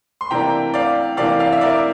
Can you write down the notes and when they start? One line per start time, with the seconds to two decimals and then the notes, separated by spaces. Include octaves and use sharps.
0.21 C6
0.31 C3 E3 A#3 D4 G5 A#5
0.74 D5 F5
1.17 C3 E3 A#3 D4 D5 F5
1.39 D5 F5
1.52 E5
1.61 A#4 D5